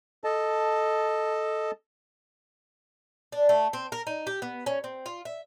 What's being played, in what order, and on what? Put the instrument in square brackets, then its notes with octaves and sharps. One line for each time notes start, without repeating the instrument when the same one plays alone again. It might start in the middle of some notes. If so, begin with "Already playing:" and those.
[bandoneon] A4 D#5 A5
[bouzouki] D4
A3
C4
A#4
D#4
G4
B3
C#4
C4
F4
E5